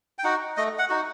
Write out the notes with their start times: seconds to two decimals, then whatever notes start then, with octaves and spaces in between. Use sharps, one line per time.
0.18 G5
0.24 D#4 F#4 F#5
0.57 A3 D#5
0.79 F#5
0.89 D#4 F#4